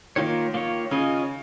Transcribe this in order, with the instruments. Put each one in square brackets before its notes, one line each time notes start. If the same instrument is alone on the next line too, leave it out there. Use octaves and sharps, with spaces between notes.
[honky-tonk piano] D#3 [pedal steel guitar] A#3 F4 C#5
[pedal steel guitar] A#3 F4 C#5
[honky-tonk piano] C#3 [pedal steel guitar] C#4 F4 G#4 D#5